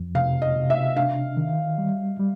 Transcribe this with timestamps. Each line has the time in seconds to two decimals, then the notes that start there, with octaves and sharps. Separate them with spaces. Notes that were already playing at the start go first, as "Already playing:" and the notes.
Already playing: F2 F3
0.15 C3 F5
0.42 D#5
0.56 C3
0.70 E5
0.97 D4 F5
1.37 D#3
1.78 G3
2.19 G3